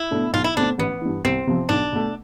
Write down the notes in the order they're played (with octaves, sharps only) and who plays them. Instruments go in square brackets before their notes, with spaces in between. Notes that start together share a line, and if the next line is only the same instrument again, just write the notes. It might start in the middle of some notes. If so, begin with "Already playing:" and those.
Already playing: [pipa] E4
[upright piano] B2 A3 D4 A4
[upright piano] B1 [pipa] F4
[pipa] E4
[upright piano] B2 A3 C4 [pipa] D4
[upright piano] A1 [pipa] B3
[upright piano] G2 E3
[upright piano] C2 [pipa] C4
[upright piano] C3 F3
[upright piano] B1 [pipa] D4
[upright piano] B2 A3